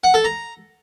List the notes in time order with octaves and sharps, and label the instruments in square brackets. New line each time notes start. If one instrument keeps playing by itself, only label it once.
[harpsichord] F#5
A4
A#5